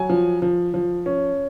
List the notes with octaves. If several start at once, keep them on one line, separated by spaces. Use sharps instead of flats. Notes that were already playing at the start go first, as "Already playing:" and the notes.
Already playing: F#3 G#5
F3
F3
F3
C#4